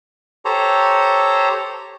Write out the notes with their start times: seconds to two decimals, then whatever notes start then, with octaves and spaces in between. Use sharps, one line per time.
0.45 G4 A4 C5 C#5 A#5